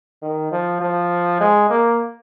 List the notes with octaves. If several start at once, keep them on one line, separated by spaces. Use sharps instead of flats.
D#3
F3
F3
G#3
A#3